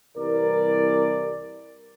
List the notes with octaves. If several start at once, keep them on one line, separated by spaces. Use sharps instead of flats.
C2 E3 A#4 D5